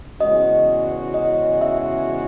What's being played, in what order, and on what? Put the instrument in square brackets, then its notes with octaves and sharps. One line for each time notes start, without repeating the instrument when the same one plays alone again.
[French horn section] E2 C#3 G#3 C#4 F#4 [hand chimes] D#5
[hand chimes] D#5
E5